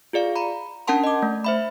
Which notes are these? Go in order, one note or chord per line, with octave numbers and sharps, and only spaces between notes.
F4 G#4 D5 F5
A#5 B5
C#4 D4 A#4 F#5 A5 C6
D#5 D6
A3
C5 E5 B5